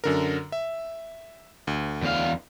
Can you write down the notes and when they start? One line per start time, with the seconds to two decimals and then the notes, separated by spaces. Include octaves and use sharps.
0.04 F#2 D3 A#4
0.52 E5
1.67 D2
2.02 E2 F5